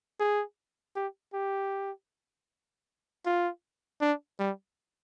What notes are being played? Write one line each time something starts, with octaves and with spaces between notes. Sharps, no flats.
G#4
G4
G4
F4
D4
G3